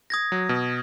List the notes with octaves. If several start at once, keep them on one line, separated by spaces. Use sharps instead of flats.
D#6 G#6 A#6
F#3
B2